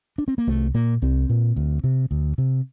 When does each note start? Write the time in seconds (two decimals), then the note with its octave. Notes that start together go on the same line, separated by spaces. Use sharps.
0.18 D4
0.28 C4
0.38 A#3
0.47 C2 A3
0.74 A#2 A#3
1.02 C2 C4
1.29 A#2
1.56 D2
1.84 C3
2.11 D2
2.38 C3